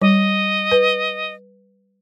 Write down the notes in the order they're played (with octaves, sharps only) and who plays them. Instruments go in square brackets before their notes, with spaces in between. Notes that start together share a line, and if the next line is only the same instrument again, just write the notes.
[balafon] G3 [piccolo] D#5
[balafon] B4